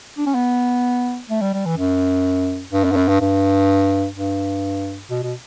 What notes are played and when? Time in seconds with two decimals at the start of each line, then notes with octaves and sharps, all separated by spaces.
0.18 D4
0.26 C#4
0.35 B3
1.30 A3
1.42 G3
1.54 G3
1.66 E3
1.78 F#2
2.73 G2
2.85 F#2
2.92 G2
2.97 F#2
3.09 G2
3.20 G2
4.15 G2
5.11 B2
5.23 B2